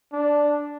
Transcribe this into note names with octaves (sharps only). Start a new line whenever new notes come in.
D4